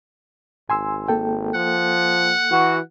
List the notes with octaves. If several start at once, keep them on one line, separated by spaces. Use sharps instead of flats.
G#1 G#5 C6 E6
A#3 A4 G5
F3 F#5
E3 F#4